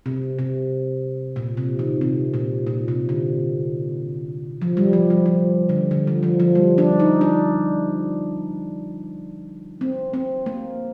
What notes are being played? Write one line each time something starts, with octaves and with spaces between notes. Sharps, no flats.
C3
C3
A#2
C3
D#3
C3
A#2
A#2
C3
D3
F3
G3
F3
F3
F3
D3
D3
F3
F3
F3
G3
D4
D#4
D4
C4
C4
A#3